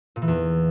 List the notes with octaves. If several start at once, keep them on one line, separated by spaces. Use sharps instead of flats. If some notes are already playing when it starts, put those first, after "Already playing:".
A#2
E3
E2